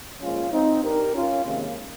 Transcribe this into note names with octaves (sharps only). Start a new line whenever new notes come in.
A#2 F3 G#3 C#4 F4
C4 D#4
G2 G3 G4 A#4
C#4 F4
C3 D#3 G#3 A#3 C#4